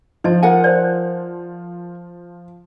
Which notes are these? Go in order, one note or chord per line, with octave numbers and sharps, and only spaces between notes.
F3 D#4 D#5 A5
A#4 F#5 G#5
C5 D5